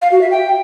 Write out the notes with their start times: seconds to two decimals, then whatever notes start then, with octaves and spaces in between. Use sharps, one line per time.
0.02 F5
0.12 F#4
0.21 E5
0.31 G5